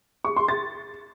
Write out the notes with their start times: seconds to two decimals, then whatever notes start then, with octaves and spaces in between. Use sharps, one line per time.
0.25 C#6
0.36 C6
0.48 A6